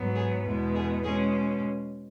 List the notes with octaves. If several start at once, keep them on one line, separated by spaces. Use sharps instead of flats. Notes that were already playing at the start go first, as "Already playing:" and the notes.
Already playing: G#2 F#3 B3
G#4
E2 B2 G#3 B3 B4
G#4
B2 G#3 C#4 G#4